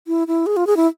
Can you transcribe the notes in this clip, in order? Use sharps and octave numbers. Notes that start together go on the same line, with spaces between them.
E4
E4
G#4
F4
G#4
E4